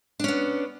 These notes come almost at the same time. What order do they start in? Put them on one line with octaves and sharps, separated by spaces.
D4 C#4 B3